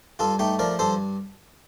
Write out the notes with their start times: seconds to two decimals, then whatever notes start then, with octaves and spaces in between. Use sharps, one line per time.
0.19 G2 F4 A4
0.39 A3 D#4 G4
0.59 F3 A#4 D5
0.79 G2 A4 C5